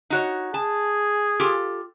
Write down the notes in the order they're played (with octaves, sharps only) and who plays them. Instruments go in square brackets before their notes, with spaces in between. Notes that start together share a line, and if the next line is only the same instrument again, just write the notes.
[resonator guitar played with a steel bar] D#4 F#4 C#5
[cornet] G#4 [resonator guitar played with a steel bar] A5
[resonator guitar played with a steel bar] F4 G4 A4